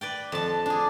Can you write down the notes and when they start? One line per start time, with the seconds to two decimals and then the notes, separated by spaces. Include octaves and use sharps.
0.01 B4 D5 G5
0.32 F2 A5
0.66 D4 G#4